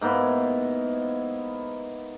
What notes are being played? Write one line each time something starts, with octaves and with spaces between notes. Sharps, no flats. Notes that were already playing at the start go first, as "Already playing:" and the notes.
G#2 A#3 B3 E4